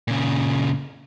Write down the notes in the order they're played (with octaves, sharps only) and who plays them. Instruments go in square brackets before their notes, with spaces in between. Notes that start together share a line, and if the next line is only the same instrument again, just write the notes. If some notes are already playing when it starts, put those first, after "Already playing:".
[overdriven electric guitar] A#2 C#3